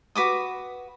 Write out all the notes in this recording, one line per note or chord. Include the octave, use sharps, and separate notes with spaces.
F#4 B4 D6 D#6